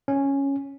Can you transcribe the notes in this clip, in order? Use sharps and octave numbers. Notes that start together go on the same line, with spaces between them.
C#4